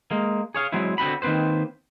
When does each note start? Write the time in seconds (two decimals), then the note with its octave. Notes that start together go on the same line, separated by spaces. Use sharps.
0.11 G#3 A#3
0.54 G#4 C#5 F5
0.72 F#3 G#3 C4 E4
0.98 D3 C4 F#4 B5
1.22 D#3 A#3 C4 B4 C5